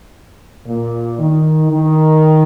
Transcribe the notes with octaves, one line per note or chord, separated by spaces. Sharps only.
A#2
D#3
D#3